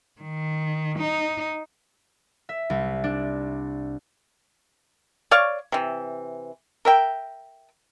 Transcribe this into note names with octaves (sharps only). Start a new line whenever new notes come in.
D#3
D#4
E5
C2
D4
C#5 D5 F5 C#6
C3 E3
A#4 E5 G5